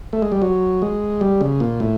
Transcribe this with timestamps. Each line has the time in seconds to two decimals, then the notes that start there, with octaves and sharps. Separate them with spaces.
0.13 A3
0.22 G#3
0.32 G3
0.42 F#3
0.82 G#3
1.21 G3
1.41 C#3
1.60 A#2
1.80 A2